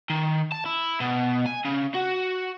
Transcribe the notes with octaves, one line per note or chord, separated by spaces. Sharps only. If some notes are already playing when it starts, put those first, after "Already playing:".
D#3
A5
E4
B2
G#5
C#3
F#4